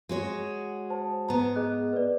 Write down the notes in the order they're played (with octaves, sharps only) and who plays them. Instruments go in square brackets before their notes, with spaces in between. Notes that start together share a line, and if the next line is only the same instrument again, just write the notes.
[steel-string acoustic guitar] G#3 F#4 C#5
[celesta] C5 A5
[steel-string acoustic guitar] G#2 B3 [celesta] A#5
[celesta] G#4 D#5 F#6
B4 D5